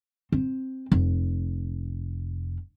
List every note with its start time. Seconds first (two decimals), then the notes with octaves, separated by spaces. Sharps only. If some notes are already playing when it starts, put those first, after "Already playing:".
0.32 C4
0.92 F1